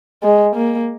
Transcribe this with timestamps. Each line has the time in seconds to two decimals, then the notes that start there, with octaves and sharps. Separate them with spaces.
0.23 G#3
0.56 A#3